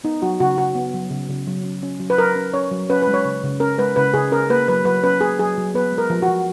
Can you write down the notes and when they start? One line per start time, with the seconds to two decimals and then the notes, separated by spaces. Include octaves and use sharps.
0.04 B3 D#4
0.22 F#3 F#4
0.40 C#3 F#4
0.57 C#3 F#4
0.75 B3
0.94 F#3
1.10 C#3
1.29 C#3
1.47 F#3
1.64 C#4
1.83 C#4
2.00 F#3
2.10 B4
2.18 F#3 A#4
2.35 C#4
2.54 C#4 C#5
2.71 F#3
2.89 C#4 B4
3.02 B4
3.07 G#3
3.14 C#5
3.25 C#3
3.44 C#3
3.60 C#4 A#4
3.78 G#3 B4
3.96 C#3 B4
4.14 C#3 G#4
4.31 C#4 A#4
4.50 A#3 B4
4.68 F#3 B4
4.85 F#3 B4
5.03 C#4 B4
5.21 A#3 G#4
5.39 F#3 G#4
5.58 F#3
5.74 B3 B4
5.92 G#3
5.98 A#4
6.10 F3
6.22 F#4
6.28 F3